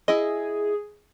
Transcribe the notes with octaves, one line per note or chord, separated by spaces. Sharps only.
E4 G#4 D#5